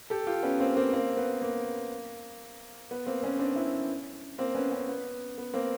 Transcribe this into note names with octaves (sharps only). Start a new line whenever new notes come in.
G4 A4
F4 G4
B3 C#4
A#3 C4
A#3 C4
A#3 C4
B3
A#3
B3
A#3 C4
B3 C#4
C4 D4
D4 E4
A#3 C4
B3 C#4
B3 C#4
B3
B3
A#3 C4